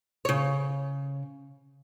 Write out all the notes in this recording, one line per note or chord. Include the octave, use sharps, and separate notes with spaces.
C#3 C#5